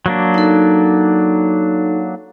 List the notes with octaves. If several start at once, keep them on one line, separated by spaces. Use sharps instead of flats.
F#3 A#3 D4
D#4 A4